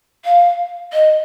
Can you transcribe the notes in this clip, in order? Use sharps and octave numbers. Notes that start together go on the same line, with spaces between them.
F5
D#5